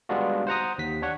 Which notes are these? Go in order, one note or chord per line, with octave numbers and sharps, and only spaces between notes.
G3 G#3 B3 D4 F4 F#4
C5 F#5 A#5 D#6
D#2 B6
D4 C#5 F#5